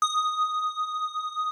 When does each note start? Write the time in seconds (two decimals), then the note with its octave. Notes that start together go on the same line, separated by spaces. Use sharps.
0.02 D#6